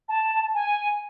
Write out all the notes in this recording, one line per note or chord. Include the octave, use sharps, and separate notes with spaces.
A5
G#5